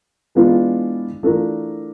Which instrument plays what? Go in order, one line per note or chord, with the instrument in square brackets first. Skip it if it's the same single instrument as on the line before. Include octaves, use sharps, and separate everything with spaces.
[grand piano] E3 G#3 B3 D4 F4
E3 A3 D4 F4 A#4